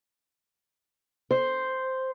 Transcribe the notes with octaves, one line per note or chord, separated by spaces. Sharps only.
C5